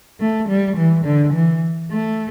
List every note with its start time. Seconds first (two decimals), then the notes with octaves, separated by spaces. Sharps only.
0.20 A3
0.49 G3
0.77 E3
1.05 D3
1.34 E3
1.91 A3